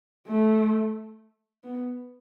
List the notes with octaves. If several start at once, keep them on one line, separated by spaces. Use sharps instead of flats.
A3
B3